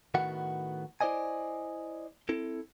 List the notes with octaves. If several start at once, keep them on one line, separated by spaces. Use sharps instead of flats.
A2 D#3 B3 E4 F#4 F#5
E4 C5 D5 D#5 G#5
C4 E4 A4